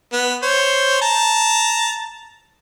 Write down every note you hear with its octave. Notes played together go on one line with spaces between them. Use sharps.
B3
C5 C#5
A5 A#5